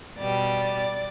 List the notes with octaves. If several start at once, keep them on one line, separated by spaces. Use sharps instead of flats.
B2 G3 D5